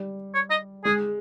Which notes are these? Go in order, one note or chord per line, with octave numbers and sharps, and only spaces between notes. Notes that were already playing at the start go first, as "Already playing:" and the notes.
Already playing: G3
C#5
D#5
G#3 G#4